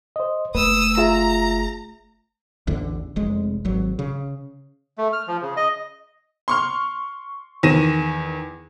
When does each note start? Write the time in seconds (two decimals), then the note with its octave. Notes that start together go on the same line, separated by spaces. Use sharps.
0.16 C5 D#5
0.55 F#1 A3 B4 D#6 E6
0.98 F4 G#4 E5 A#5
2.67 A1 E2 D3
3.16 F1 G#3
3.65 G#1 F#3
3.99 C#3
4.98 A3
5.13 F6
5.27 F3
5.42 C#3
5.57 D#5
6.48 C6 C#6 F6
7.63 E2 D#3 A#6 D#7 E7